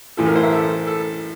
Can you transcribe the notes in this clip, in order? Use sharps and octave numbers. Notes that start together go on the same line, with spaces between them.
A1 A2 E3 A4
A#4
C5
E5
A4
A4